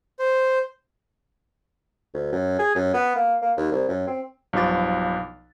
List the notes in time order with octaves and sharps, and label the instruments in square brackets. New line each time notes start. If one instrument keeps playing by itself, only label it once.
[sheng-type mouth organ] C5
[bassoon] D2
F#2
G#4
F#2
B3
A#3
A#3
D#2
C2
F#2
C4
[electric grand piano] B1 G2 F3 F#4 D6 A6